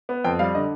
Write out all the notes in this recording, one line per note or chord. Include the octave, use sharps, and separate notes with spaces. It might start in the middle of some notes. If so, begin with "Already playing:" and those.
B3
F2 G5
G3 F5
D3 D#5